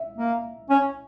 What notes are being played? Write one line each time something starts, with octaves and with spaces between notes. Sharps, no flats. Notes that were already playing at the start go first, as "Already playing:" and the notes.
Already playing: E5
A#3
C#4